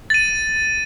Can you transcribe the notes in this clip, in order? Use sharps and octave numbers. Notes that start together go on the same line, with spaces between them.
A6 D#7